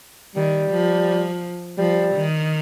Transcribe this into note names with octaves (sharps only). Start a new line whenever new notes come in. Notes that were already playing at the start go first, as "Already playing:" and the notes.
D#3 G3
F3
F3 G3
D#3